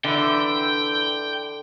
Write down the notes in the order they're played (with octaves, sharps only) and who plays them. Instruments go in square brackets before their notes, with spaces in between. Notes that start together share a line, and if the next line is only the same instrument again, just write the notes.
[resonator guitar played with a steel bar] D3 [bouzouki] E3 E4 [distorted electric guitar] G5